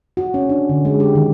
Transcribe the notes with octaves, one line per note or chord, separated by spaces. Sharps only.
F#4
C#4
D4
D3
G#3
G4
D#3